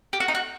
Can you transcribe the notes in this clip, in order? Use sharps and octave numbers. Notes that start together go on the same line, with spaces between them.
G4
F#4
D#4
F#4